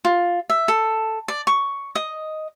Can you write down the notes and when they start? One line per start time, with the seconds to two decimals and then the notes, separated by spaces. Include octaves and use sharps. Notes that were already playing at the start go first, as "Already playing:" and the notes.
0.05 F4
0.49 E5
0.68 A4
1.28 D5
1.47 C#6
1.95 D#5